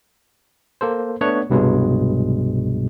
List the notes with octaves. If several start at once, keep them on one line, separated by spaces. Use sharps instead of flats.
A#3 A4 C5
A3 B3 D4 C#5 F#5
C2 G2 B2 F#3 G#3